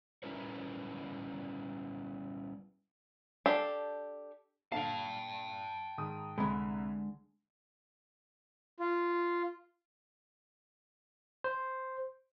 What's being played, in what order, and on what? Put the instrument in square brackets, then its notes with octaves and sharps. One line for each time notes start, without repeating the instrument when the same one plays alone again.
[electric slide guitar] G3 C#4 E4 A#4 B4 C#5
[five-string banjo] D4 G4 A4 F5
[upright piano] A#2 D3 F7 [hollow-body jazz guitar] F5 [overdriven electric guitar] G5 A5
[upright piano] G#2 D#3 D#6
[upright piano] C2 B5 [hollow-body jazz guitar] D3 G#3
[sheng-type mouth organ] F4
[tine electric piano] C5